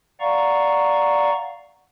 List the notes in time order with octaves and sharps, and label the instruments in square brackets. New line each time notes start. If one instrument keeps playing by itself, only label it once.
[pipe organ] D5 F5 F#5 A#5 C#6